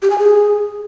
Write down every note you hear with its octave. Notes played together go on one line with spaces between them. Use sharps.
G4
G#5
G#4